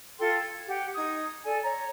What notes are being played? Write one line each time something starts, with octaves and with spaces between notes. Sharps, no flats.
F4 A4 G5 C6
G#6
G4 F#5
D#4 D#6 G#6
A4 D5 G#5
C#5 A#5